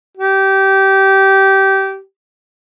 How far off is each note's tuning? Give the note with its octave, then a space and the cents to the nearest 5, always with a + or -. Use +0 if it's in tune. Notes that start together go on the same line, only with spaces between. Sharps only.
G4 -20